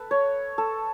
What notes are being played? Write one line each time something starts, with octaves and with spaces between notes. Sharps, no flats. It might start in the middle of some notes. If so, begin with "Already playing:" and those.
Already playing: A4 B4
C#5
A4